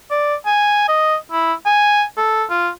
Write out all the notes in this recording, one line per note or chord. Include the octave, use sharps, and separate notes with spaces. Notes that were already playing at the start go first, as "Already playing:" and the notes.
D5
G#5
D#5
E4
G#5
A4
F4